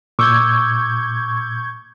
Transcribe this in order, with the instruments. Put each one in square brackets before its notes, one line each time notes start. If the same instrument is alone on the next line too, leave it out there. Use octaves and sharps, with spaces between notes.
[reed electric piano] A#2 [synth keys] C#6 G6 G#6 [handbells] D6 E6